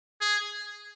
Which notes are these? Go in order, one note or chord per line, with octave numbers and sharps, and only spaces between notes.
G#4